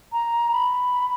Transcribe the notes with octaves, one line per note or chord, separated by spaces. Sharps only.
A#5
B5